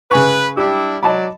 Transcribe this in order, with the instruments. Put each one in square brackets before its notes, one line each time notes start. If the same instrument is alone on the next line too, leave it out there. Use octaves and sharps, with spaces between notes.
[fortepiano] C#3 G#5 C#6 [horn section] B4
[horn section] G3 D4 E4 [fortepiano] G4
[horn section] F#3 D5 [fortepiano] D#5 A5 B5